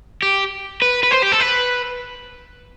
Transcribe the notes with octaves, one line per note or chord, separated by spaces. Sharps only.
G4
B4
B4
C5
G4
A4
B4